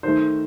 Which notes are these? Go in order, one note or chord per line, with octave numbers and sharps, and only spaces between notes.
D#3 A3 C5